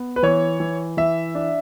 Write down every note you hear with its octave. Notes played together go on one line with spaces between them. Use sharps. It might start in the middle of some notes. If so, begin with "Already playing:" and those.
Already playing: B3
B4
E3 C#5
E3
E3 E5
D4